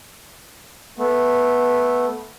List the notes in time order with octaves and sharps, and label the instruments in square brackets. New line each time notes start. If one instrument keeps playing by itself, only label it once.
[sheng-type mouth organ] A3 B3